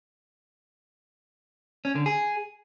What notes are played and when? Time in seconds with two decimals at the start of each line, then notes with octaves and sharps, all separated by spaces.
1.85 C#4
1.95 D3
2.06 G#4